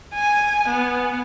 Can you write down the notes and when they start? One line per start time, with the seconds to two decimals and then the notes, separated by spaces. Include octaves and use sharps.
0.14 G#5
0.68 B3